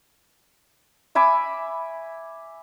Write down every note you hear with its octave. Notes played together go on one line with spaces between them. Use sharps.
E5 G#5 B5 D6